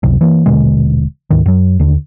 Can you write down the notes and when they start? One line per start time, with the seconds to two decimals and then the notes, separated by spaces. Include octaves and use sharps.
0.03 F#1 C#2 C3 F#3
0.21 E3 A#3
0.46 D#1 B2 D3 G#3
1.30 D2 G#2 D#3
1.46 F#2 F#3
1.79 D#2 D3